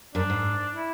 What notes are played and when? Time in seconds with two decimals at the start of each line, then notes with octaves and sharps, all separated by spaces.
0.15 F#2 D4
0.30 G#2
0.74 E4